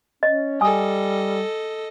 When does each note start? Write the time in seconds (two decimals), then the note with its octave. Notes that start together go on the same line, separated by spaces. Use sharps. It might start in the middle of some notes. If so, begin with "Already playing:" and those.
0.23 C#4 D#5
0.61 G3 A4 D#5 G#5 D#6